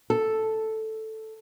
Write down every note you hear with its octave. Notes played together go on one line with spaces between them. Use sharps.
A4